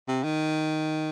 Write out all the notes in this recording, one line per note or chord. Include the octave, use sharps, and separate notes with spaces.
C3
D#3